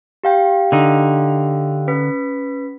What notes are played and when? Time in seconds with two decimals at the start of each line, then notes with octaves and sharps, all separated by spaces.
0.23 G4 F5 G5
0.72 D3 D#4
1.88 C#4 B4 B6